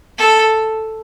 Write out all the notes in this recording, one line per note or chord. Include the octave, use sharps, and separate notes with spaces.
A4